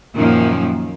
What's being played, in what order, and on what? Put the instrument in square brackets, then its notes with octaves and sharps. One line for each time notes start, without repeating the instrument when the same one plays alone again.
[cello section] F#2 A#2 D#3 F3 A#3